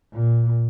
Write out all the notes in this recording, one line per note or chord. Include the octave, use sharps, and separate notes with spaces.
A#2